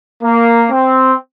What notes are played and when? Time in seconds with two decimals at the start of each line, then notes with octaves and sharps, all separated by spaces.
0.22 A#3
0.70 C4